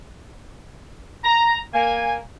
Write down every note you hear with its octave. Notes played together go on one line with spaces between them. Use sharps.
A#5
A#3 G#5